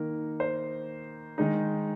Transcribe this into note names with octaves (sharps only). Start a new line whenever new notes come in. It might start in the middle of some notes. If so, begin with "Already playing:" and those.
Already playing: D#3 A#3 D#4 A#4
C5
D#3 G#3 D#4